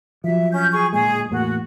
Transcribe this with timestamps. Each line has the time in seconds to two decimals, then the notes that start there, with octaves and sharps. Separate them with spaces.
0.24 F3 F#3 E5
0.52 C#4 G6
0.72 G#4 C#6
0.93 D1 A#2 G#3 G#4
1.31 E2 A2 A#3 F#4